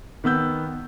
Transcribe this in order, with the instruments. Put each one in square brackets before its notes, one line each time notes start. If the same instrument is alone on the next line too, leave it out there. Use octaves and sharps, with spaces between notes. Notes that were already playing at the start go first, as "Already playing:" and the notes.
[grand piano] D#3 B3 E6 G6